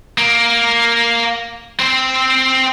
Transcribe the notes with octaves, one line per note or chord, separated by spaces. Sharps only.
A#3
C4 C5